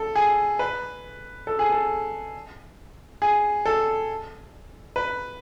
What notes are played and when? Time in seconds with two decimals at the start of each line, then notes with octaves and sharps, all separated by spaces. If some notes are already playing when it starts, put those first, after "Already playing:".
Already playing: A4
0.15 G#4
0.59 B4
1.47 A4
1.59 G#4
1.72 A4
3.22 G#4
3.66 A4
4.96 B4